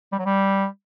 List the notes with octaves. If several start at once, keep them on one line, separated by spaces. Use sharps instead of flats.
G3
F#3
G3